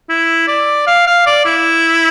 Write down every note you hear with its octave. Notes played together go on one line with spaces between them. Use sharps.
E4
D5
F5
F5
D5
E4